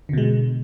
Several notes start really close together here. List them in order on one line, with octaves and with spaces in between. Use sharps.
D3 B2 G#3